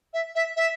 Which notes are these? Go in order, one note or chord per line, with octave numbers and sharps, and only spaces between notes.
E5
E5
E5